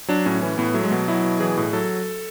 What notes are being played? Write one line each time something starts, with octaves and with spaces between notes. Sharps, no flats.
F#3 D4
A2 C#4
E3 C#4
A2 B3
F#3 A3
G#3
B2 A3
F#3 E4
B2
E3 G#4
A2
F#3 A4